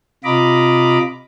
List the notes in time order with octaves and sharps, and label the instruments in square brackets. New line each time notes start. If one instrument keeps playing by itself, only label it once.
[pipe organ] C3 F4 D#5 A#5 B5 D6